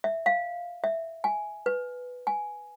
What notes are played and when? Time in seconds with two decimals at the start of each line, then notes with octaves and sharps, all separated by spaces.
0.04 E5
0.26 F5
0.84 E5
1.24 G#5
1.66 B4
2.27 G#5